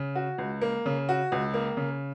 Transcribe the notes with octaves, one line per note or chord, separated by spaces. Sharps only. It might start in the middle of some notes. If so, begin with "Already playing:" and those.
Already playing: C#3
F#4
C#2
A#3
C#3
F#4
C#2
A#3
C#3